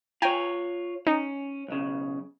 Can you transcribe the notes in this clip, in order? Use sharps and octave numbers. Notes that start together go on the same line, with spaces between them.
F4 C#5 G5 G#5 A#5
C#4 D#4
B1 C#3